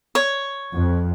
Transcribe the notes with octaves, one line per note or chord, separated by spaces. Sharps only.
C#5
F2